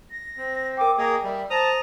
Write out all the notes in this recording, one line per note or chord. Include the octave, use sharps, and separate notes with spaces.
A#6
C4
A#4 G5 D6
A#3 G#4 D#5
G3 E5
C5 A5 A#5 D#6